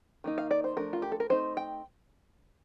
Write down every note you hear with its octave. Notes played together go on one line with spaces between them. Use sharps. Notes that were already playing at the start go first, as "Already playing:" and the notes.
D#3 A#3 D#4
F5
D5
C5
F3 A3 D4 A#4
F4
G4
A4
A#4
A3 C4 D#4 C5
G5